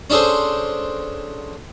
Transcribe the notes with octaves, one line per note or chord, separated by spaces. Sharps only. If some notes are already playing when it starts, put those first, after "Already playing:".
C#4 D4 G#4 A4 C5